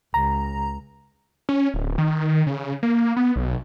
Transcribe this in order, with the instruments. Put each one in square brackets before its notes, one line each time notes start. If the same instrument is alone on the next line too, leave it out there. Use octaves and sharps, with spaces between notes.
[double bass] C#2 [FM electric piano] A#5
[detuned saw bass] C#4
D1
D#3
C#3
A#3
B3
B1